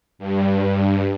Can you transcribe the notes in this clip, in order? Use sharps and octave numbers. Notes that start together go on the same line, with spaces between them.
G2